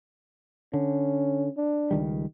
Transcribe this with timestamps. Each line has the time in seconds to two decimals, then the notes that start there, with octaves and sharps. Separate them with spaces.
0.73 D3 C#4
1.57 D4
1.91 C#2 D#3 G3